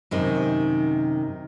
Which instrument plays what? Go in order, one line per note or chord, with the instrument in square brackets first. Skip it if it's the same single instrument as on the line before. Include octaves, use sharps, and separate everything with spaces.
[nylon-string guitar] F#2 C3 D#3